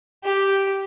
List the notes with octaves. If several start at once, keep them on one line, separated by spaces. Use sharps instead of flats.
G4